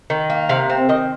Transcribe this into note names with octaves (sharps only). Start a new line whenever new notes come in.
D#3
A#3
C3 F5
C4
D#3 D#5